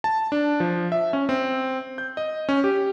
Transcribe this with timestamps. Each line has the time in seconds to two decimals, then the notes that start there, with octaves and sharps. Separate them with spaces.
0.04 A5
0.32 D4
0.60 F3
0.92 E5
1.13 C#4
1.29 C4
1.98 G6
2.17 D#5
2.49 C#4
2.64 G4